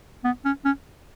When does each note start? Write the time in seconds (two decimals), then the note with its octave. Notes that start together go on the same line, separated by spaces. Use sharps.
0.24 B3
0.45 C#4
0.65 C#4